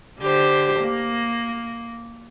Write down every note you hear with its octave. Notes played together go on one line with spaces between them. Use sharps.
D3 G4 C5
A#3